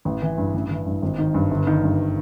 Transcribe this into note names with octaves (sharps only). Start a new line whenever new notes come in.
A1
E3
G2
A1
E3
G2
G#1
D#3
G2
G1
D#3
G2